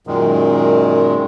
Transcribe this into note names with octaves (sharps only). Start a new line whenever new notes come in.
F#2 A#2 D#3 G#3